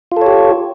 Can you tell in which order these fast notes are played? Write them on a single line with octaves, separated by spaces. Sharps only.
F4 A4 C#5 G4